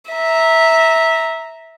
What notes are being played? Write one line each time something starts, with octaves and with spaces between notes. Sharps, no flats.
E5 A#5